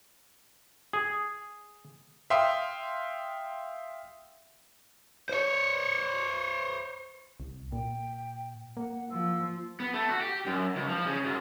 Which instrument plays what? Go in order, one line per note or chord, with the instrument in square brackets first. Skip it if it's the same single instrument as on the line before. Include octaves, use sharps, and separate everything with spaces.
[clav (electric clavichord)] G#4
[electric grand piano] E5 F5 G5 C6 D#6
[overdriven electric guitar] C5 C#5
[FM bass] C2
[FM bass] A#2 [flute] G5
[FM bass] A#3 [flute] F#5
[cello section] F3 [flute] E6
[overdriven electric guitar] B3
A3
F#4
G4
F#2
C#2
F3
C#3
F#2